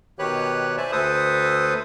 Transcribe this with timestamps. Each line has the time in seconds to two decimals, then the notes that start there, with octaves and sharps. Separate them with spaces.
0.19 B2 D#3 G4 B4 C#5 F#6
0.77 C5 D5 E5 G#5 A5
0.92 D2 A4 B4 C5 D#6